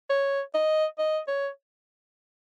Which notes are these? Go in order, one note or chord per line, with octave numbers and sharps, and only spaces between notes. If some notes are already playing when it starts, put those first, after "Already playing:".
C#5
D#5
D#5
C#5